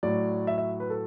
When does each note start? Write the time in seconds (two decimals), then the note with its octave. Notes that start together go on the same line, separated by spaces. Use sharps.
0.03 A2 F#3 D5
0.47 E5
0.58 E5
0.80 B4
0.90 A4